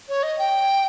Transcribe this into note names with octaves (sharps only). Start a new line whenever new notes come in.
C#5
D#5
G5